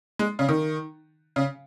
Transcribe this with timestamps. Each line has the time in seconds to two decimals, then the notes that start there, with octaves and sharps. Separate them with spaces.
0.19 G#3
0.39 C#3
0.49 D#3
1.36 C#3